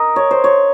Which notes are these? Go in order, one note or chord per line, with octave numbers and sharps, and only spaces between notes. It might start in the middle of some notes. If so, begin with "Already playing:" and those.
Already playing: A#4 D#5
C#5
C5
C#5